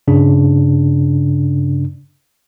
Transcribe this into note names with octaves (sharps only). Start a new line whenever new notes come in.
G2 C#3 D4